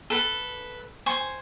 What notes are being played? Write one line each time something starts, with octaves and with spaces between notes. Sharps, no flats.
A4 B4
C5 G#5 C#6